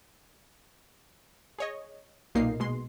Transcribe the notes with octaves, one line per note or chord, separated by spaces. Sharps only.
G#4 C#5 D#5
B1 A#2 A#3 D#4 C7
B2 G#3 C6